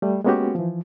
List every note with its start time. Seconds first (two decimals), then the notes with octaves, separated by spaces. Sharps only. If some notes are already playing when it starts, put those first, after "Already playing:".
0.02 G3 A3
0.24 G#3 A#3 B3 C#4 F#4 G4
0.55 E3 F3